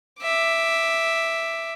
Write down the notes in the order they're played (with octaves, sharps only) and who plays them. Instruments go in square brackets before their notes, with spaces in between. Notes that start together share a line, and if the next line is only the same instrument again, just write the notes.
[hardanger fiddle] E5 D6